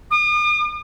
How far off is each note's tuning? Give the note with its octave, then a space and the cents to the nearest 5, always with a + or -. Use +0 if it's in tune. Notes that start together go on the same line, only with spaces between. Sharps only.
D#6 -45